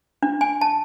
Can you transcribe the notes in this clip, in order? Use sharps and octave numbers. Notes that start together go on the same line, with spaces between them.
D4
G#5
A5